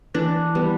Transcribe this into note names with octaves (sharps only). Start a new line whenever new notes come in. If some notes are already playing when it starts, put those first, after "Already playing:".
E3 D4
G3 B3